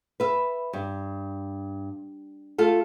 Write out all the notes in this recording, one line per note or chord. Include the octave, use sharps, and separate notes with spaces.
B4 E5
G2
A3 F4 A4